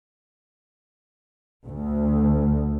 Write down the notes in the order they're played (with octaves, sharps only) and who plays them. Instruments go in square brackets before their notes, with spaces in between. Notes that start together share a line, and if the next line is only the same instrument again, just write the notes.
[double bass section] D2